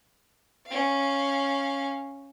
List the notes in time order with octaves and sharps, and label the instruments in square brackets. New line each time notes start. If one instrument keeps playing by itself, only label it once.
[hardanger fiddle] C#4 F5